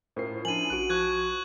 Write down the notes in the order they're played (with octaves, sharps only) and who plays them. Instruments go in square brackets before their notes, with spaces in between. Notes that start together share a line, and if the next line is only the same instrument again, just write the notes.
[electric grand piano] A2 C#4 C7 [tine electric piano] F4 A#4 C5
[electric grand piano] F3 E4 [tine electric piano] D4 G#5 [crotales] D#7 F#7
[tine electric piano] A#1 F#4 [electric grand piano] F#6 D7
[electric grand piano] F3 [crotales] C#6 F#6 G#6